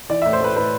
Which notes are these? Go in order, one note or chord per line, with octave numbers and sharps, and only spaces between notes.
E3 D5
A2 E5
C5
A3 B4
A2 B4